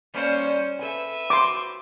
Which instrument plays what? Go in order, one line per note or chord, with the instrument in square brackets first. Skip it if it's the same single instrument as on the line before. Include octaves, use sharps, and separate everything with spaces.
[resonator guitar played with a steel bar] G3 A#3 D5 [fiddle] C#4 C5
[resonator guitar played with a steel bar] A4 G#5 [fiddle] B4 E5
[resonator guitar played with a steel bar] F#4 C5 [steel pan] C6 D6